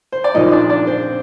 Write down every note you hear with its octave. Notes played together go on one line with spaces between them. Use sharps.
C5
D5
A#1 A#2 F3 D#4 D#5
D4 D5
D4 D5
C4 C5